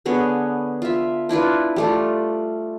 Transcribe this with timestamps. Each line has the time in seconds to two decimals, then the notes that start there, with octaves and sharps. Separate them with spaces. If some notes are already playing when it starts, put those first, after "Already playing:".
0.05 D3 B3 G#4 C#5
0.82 F4 E5
1.29 D4 E4 F4 B4
1.76 G3 A3 F4